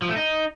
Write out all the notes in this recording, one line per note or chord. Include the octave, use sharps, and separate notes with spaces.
F3
A3
D#4